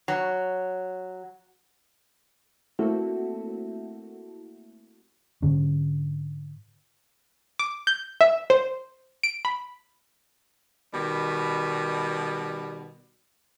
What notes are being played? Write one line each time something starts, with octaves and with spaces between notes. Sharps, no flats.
F#3
A3 A#3 C4 E4 F#4 A4
G#2 D3 C#4
D6
G6
E5
C5
D7
B5
B2 D#3 G3